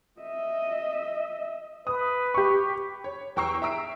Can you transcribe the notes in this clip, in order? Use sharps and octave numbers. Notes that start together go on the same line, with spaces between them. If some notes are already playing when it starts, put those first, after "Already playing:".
D#5 E5
B4 D#6
G4 C#6
C#5
E2 G5 A#5 C#6 E6 C7
E5 A#5 E6 D7